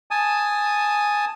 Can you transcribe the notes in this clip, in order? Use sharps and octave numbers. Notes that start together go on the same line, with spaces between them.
G#5 A5 D#6